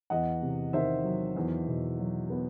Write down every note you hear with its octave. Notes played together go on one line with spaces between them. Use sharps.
E2 D#5 F#5
C3
D#3 C5 E5
F#3
E2
B2
F#3
B3